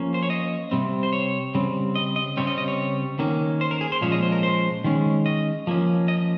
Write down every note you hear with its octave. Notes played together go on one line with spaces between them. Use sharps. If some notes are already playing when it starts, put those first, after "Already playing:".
Already playing: F3 A#3 C#4
C5
C#5
D#5
C3 G3 C4
C5
C#5
C#3 G3 C4
D#5
D#5
C#3 G3 C4 C#5
D#5
D#5
C#5
D#3 A#3 C#4
C5
A#4
G#4
C5
A#2 F3 G#3 C#4 C#5
D#5
C5
A#4
C5
D#3 G#3 C#4
D#5
F3 A#3 C#4
D#5